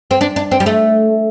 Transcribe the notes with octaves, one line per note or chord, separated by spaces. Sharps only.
C4
D4
D4
C4
G3
A3